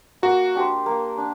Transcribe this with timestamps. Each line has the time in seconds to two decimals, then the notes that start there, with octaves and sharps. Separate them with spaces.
0.22 A#3 F#4
0.55 D4 G4 C5
0.86 A#3
1.17 D4